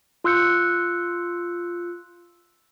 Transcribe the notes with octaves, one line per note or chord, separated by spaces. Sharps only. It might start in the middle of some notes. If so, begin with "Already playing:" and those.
F4 C6 E6 F#6 G6 C#7